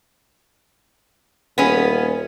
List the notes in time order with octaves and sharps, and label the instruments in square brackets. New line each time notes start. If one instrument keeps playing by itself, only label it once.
[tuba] D#1 [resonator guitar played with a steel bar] B3 C#4 G#4